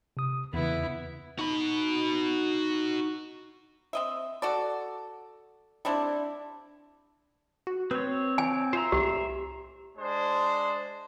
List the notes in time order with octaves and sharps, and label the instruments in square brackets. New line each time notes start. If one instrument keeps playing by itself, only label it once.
[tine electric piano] C3 D#6
[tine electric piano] E2 C#3 [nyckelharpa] B3 E4
[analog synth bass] D#4 [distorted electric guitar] F#4 B5
[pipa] C4 D#5 E5
F#4 A4 D5
G3 C4 D4 E4
[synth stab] F#4
[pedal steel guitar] C4 C#5 [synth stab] B4
[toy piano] G#5
[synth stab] F4 [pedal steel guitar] C5 E5 A#5
[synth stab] C2 A2 [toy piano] G4
[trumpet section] G#3 D4 C5